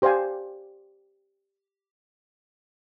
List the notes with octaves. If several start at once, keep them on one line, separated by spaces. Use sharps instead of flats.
G4 C5 D5 F5 G#5